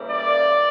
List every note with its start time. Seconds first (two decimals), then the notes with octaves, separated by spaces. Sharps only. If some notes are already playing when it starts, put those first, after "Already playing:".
Already playing: C#3 E3 G3 A#3
0.10 D5